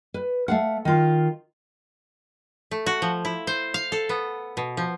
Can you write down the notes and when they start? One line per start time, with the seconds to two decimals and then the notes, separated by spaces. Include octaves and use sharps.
0.14 B4
0.48 A3 F5 F#5
0.85 D#3 F4
2.71 A3
2.86 F#4
3.02 F3
3.25 E4
3.47 C5
3.74 F5
3.92 A4
4.09 B3
4.57 B2
4.77 F3